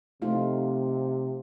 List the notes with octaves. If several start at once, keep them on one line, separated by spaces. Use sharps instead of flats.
C3 A3 D#4 F4